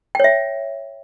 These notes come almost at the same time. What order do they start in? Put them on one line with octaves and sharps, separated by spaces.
G5 C#5 E5